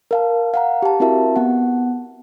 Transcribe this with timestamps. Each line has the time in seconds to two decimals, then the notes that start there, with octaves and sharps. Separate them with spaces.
0.11 A#4 F5 A5
0.54 F5 F#5 A#5
0.82 G4 A5
1.00 C4 E4 F#4 A#4 E5 A5
1.36 B3 F#5